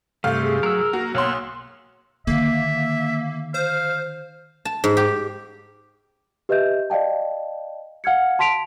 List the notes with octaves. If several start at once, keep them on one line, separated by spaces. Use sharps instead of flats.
G2 C3 A3 A4 F5
G#4
F#3 A#4 E6
A#3 F#4
B1 A#3 C#5 F#5 C6 E6 F6
D3 D#3 A#3 E5
C5 F5
A5
G#2
G4
G4 B4 D#5 E5 G6
D5 D#5 F5 G5 A5
F5 F#5 F6 G#6 C#7
A5 C6 B6 D7 F7